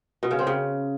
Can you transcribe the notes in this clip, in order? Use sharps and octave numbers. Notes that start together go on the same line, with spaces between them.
B2
C#3
C4
C#3